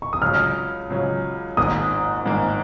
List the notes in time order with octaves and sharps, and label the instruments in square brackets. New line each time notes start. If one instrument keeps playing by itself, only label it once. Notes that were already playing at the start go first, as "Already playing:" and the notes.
[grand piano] C#6
D#6
[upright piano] C#2 C#3 F#3 [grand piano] F6
[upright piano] C#2 C#3 F#3
[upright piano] G#1 G#2 D#3 A#3 [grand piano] D#6
[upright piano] G#1 G#2 D#3 A#3